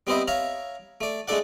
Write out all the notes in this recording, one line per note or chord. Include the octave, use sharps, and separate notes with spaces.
G3 B3 C4 C5 D#5 E5
C#5 E5 F5 A#5
A3 D5
G#3 A3 D4 A4 D5 F#5